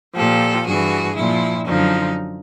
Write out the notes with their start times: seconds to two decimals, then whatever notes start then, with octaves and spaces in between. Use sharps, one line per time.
0.15 A#2 F3 G4 A4
0.65 G2 E3 F#4 G#4
1.15 A#2 F3 E4
1.65 F#2 D3 F3 D#4